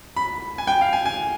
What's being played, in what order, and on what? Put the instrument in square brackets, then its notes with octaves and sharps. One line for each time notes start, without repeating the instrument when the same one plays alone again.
[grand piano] B5
G#5
G5
F5
G#5
G#5